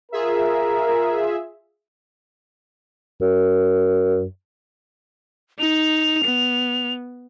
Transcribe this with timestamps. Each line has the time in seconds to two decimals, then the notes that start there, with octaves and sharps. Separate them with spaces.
0.12 F4 G#4 A#4 E5
3.21 F#2
5.59 D#4 F7
6.24 B3